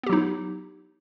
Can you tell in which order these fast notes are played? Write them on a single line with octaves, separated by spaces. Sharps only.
B3 G4 F#3 D#4